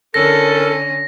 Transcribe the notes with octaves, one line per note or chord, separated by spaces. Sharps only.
D3 C#4 D4 E4 A4 A#4 A#6